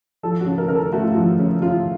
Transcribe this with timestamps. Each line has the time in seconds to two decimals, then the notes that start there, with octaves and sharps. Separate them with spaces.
0.23 F3 A4
0.41 F#4
0.46 C#3
0.58 A#4
0.68 C#3 A#4
0.75 A4
0.93 A3 F#4
1.02 F4
1.12 F3 F#4
1.40 C#3
1.62 C#3 F4